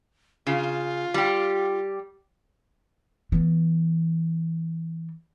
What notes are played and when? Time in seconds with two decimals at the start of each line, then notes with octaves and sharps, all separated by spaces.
0.47 C#3 F4
1.14 G3 G4
3.32 E3 B3